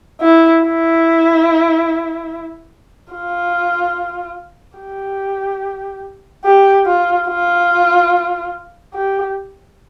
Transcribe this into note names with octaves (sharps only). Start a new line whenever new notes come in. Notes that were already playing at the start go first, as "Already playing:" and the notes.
E4
E4
F4
G4
G4
F4
F4
G4